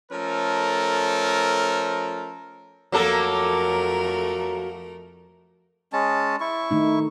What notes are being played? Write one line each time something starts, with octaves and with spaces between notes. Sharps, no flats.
F3 A3 C#4 A4 A#4
F2 F#3 A3 A#3 A4 A#4
G#3 C#4 A5
E4 C#6
D#3 A3 D#4